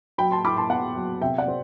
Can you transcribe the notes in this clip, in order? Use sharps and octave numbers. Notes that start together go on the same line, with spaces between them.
F#3 G5 B5
A5 C6
E4 B5 D6
A5 C6
B3 F#5 A5
F#3
C3 E5 G5
D5 F#5
C4